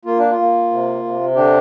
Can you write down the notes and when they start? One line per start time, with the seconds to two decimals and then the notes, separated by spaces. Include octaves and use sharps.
0.05 A#3 F4
0.18 D4
0.31 F4
0.38 A#3
0.71 C3
1.03 C3
1.35 D3 D4 G4